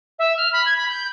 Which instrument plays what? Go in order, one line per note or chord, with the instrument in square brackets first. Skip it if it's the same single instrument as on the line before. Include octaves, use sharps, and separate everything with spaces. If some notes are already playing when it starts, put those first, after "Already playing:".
[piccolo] E5
F6
B5
G#6
B5
G6